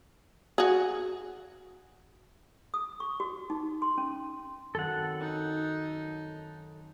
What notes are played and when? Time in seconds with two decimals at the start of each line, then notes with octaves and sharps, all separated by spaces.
0.58 F#4 G#4
2.74 D#6
3.00 C#6
3.20 F#4
3.50 D#4
3.82 C6
3.98 C#4
4.75 F#2 D#3 C4 A4 F#5
5.21 D#4